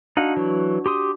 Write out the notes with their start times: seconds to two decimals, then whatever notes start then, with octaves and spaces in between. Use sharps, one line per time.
0.17 D4 D#4 F#4 F5 F#5
0.37 E3 F#3
0.86 G4 C6 D#6